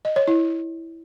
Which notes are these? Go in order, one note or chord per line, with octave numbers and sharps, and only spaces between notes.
D#5
C#5
E4